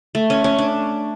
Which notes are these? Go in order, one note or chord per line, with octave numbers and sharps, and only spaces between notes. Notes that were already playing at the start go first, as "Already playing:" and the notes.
A3
C#4
C#4
D4